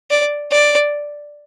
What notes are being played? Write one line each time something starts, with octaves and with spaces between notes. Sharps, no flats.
D5
D5